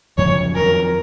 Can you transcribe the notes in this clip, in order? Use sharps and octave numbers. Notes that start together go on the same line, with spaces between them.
F#1 F#2 F3 C#5
F2 D#3 F#3 A#4